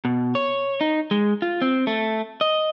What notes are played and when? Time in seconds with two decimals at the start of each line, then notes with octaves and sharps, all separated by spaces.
0.05 B2
0.35 C#5
0.81 D#4
1.11 G#3
1.42 F4
1.62 C4
1.87 A3
2.41 D#5